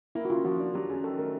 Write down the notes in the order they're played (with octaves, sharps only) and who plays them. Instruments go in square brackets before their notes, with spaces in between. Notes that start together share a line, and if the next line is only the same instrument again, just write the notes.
[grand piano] A#3 [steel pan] E4
[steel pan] F#4
[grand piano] C#3 [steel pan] F4
[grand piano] F3 [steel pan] F#4
[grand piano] D4
[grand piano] F#3 [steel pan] G4
[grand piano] F#2 [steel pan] G#4
[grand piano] D#3 [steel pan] A4
[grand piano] A3 [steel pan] A#4